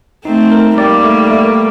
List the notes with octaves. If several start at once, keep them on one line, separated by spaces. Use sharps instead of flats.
A3 C4 D#4
A#4
G3 A#3 D5
A3
A3